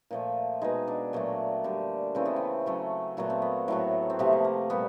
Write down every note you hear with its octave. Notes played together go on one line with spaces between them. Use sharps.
A#2 F3 A3
B2 G#3 D#4
D4
A#2 F#3 A3
D3 G3
C#3 E3 A3 C4
B3
C4
C#3 F#3 A3
A#2 F#3 A3 B3
C4
B3
A2 F#3 A3
C4
C3 F3 A3 B3
A#3
A#3
A#2 G3 B3